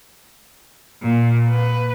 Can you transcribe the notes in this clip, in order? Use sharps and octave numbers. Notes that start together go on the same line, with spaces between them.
A#2
B4